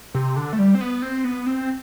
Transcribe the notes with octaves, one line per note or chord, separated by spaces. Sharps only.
C3
D3
A3
G3
C4
B3
C4
B3
C4